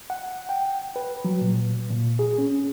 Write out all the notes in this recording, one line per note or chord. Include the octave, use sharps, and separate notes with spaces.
F#5
G5
B4
F#3
A#2
A#2
G#4
C#4